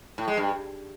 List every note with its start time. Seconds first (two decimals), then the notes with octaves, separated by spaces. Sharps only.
0.18 A2
0.28 G#3
0.37 G2